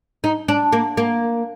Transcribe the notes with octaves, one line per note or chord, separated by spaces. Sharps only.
D#4
D4
A#3
A#3